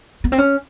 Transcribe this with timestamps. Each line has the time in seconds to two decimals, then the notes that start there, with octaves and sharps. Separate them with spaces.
0.24 B3
0.32 C4
0.38 C#4